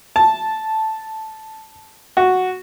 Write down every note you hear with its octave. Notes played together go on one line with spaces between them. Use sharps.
A5
F#4